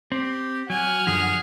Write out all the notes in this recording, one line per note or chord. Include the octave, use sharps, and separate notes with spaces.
C4 G4
F#3 F#5 G#5 F6
F#2 D3 F3 G#4